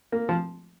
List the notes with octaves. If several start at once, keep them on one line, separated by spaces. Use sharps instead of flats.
A#3
F3